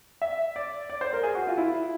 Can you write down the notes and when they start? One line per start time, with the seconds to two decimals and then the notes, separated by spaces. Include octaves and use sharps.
0.22 E5
0.56 D5
0.90 D5
1.01 C5
1.13 A#4
1.23 G#4
1.35 F#4
1.47 F4
1.57 E4